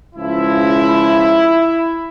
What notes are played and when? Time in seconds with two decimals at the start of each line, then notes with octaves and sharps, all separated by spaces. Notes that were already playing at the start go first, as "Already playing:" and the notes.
0.16 C#2 C#3 F3 E4